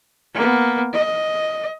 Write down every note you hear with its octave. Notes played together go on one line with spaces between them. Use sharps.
A#3 B3
D#5